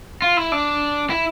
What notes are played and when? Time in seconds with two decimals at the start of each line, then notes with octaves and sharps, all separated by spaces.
0.22 F4
0.37 E4
0.52 D4
1.10 E4